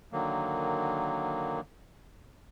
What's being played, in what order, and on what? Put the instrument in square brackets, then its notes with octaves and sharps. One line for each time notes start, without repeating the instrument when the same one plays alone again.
[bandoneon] D3 D#3 F#3 A#3